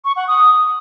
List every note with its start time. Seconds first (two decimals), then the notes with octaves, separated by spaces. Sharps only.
0.05 C#6
0.16 F#5
0.28 D#6